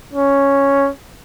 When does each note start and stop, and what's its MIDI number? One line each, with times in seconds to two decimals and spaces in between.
0.14 0.90 61